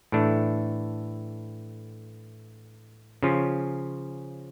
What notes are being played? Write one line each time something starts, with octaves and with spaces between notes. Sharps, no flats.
A2 E3 A3 D4
C#3 F3 C#4 F4